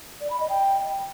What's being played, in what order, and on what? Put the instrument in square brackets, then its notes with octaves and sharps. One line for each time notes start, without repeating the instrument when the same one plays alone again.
[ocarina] D5
B5
D#5
G5